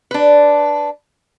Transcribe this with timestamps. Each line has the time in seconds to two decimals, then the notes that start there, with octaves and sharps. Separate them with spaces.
0.11 D4 B4